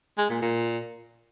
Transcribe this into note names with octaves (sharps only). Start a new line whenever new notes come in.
G#3
A#2
A#2